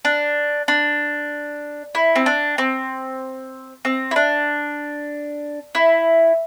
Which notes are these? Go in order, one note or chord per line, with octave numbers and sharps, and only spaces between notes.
D4
D4
E4
C4
D4
C4
C4
E4
D4
E4